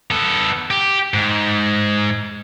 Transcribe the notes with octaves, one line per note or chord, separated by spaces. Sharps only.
B3 A4
G4
G#2